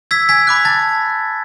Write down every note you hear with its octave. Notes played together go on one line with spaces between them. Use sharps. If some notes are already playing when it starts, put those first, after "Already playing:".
E6 G#6 B6
G#5 G#6 B6
B5 D6 F#6
A5 A6